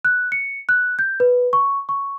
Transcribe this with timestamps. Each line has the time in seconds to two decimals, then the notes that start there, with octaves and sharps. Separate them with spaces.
0.05 F#6
0.32 C#7
0.69 F#6
0.99 G6
1.20 B4
1.53 C#6
1.89 C#6